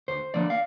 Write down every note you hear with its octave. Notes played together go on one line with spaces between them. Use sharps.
D2 C5
D3 F3 A#3 D5
F5